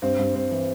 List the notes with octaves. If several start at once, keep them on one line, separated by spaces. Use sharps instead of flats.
G2 C4
G2
G2 C4
E3